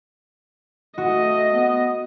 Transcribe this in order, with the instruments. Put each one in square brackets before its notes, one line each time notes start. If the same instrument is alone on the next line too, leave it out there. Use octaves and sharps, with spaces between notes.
[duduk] A3 [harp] F#4 [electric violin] D#5
[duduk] B3